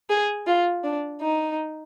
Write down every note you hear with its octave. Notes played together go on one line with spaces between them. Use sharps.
G#4
F4
D4
D#4